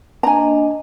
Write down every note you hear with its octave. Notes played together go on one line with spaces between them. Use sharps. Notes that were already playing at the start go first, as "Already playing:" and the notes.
A#3 D4 D#5 G#5 A#5